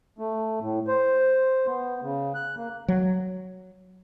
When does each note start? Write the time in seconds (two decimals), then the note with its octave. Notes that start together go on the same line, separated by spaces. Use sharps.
0.19 A3
0.61 A2
0.88 C5
1.67 B3
2.02 C#3
2.35 F#6
2.57 A#3
2.88 F#3